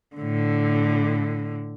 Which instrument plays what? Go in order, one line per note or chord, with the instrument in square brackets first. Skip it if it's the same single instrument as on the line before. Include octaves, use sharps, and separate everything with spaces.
[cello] A2 D3